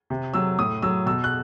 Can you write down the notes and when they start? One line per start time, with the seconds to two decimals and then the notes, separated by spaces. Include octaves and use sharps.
0.10 C3
0.34 F#3 E6
0.59 A2 D#6
0.82 F#3 E6
1.06 B2 E6
1.24 F#6